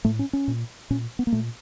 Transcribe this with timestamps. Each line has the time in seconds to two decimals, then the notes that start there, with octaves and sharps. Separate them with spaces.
0.05 A2 A3
0.19 C#4
0.33 C#4
0.48 A#2
0.90 A#2 C#4
1.19 B3
1.27 A#3
1.32 A#2 A3